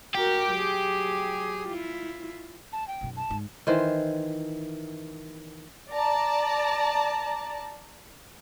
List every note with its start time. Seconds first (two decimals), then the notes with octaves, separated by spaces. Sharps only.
0.15 F#4 G4 A#4
0.53 F#3 G#4
1.68 E4 F4
2.73 A5
2.88 G5
3.01 B1 F#2
3.16 A5
3.30 G#2
3.67 D#3 E3 C5
5.91 D5 A5 A#5